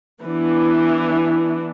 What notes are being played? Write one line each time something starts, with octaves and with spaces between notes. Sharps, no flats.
E3 B3 D4